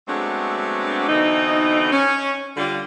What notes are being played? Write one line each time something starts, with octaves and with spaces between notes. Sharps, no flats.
F#3 G#3 A3 B3 C4 D4
B2 D3 E3 C4 D#4
C#4
D3 G3 F4